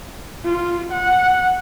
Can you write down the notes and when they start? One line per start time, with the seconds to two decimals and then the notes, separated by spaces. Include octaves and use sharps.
0.45 F4
0.92 F#5